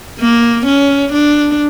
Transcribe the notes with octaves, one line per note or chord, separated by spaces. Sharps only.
A#3
C#4
D4